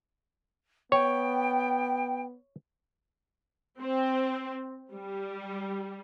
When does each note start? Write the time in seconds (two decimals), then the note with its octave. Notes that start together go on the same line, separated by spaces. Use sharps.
0.92 B3 C#5 G5
3.80 C4
4.93 G3